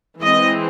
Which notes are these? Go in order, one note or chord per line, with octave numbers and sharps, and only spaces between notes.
E3 G#3 C4 D#5